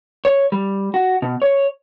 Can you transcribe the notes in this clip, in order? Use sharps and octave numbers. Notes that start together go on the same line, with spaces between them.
C#5
G3
F#4
B2
C#5